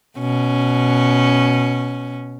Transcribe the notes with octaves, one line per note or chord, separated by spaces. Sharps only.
B2 C#4